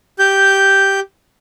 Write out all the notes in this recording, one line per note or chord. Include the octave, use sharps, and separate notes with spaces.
G4 G6